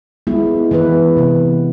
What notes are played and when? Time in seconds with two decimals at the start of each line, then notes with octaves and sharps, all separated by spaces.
0.27 G#3 B3 E4
0.71 E3 B3 E4 B4
1.17 C3 E3 B3